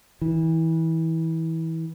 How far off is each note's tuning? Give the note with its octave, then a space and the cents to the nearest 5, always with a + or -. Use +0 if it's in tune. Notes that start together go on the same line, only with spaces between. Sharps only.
E3 -25